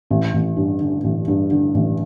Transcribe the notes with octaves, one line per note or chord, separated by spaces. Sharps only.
A1
A1
G2
D3
A1
G2
D3
A1